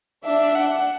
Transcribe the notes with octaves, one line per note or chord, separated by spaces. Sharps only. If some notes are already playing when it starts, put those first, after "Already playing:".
D4 E5
F#5